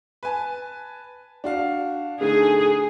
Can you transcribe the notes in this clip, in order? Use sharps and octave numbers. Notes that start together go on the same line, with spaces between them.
B4 G#5 A5
D4 F#4 F5
D3 A3 D#4 G#4